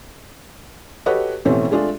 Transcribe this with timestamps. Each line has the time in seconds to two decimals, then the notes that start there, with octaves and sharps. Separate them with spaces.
1.06 F#4 G4 A4 B4 C#5 D#5
1.45 A1 B2 E3 A3 C4 C#4
1.71 G#3 A3 D4 F4 G#4